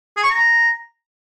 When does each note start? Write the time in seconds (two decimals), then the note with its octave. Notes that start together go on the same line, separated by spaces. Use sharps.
0.17 G#4
0.23 C#6
0.30 A#5